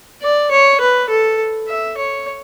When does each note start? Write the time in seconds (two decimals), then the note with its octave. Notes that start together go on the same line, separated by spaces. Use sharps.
0.22 D5
0.51 C#5
0.81 B4
1.09 A4
1.68 E5
1.97 C#5